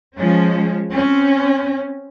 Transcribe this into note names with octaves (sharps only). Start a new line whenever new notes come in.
F3 G#3 C#4
C4 C#4